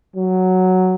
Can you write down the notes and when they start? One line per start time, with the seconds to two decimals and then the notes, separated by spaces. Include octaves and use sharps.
0.16 F#3